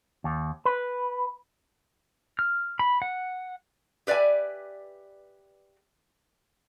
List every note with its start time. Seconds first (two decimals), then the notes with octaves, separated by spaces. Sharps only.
0.24 D#2
0.65 B4
2.39 F6
2.79 B5
3.02 F#5
4.07 G4 B4 D5 E5 G#5